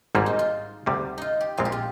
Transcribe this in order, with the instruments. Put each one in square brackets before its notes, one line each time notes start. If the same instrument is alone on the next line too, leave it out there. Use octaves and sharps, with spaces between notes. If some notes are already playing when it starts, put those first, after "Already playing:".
[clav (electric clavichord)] G#1 G#2 G3 A#3 [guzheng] D#4
[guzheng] D#4
F4
[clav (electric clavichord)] D2 C3 G3 A#3
[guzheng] D#4 F4
G4
[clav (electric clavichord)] A#1 A#2 G#3 C4 [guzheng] F4
[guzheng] G4
F4